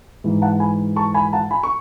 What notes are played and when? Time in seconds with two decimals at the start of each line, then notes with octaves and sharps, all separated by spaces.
0.24 G#2 E3
0.42 F#5 A5
0.60 G#5 B5
0.96 A5 C#6
1.14 G#5 B5
1.33 F#5 A5
1.51 G#5 B5
1.63 C#6